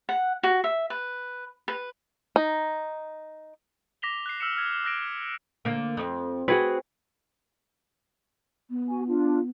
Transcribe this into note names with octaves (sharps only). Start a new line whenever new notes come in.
F#5
F#4
E5
B4
B4
D#4
D6 A#6 B6 F7 G7
F#6 C7
E6 F6 A#6 C#7 E7
F6 G#6
E6 F#6 A#6 D7
D3 A#3
F2
C4 F#4 G#4 B4
B3
F#4 G#5
D4 F4